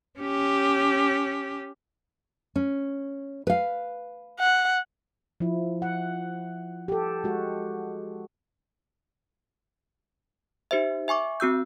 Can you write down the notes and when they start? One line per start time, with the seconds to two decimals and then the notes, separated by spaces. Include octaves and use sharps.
0.19 C#4 G4
2.56 C#4
3.47 B4 F5
4.40 F#5
5.40 F3 E4
5.82 F#5
6.88 G4 A4
7.24 G#3 F#4
10.71 D#4 G4 C5 E5
11.08 E5 G#5 C#6 D6
11.40 C4 F#4 E6 G6